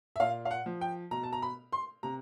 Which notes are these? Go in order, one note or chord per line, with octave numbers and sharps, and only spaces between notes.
E5
A#2 F5
F5
F#5
F3
G5
B2 A#5
A5
A#5
B5
C6
C3 A#5